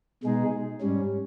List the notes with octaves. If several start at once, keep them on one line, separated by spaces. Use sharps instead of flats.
B2 G#3 D#4 G#4
G#2 G3 C#4